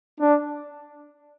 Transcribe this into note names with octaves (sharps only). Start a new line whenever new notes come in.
D4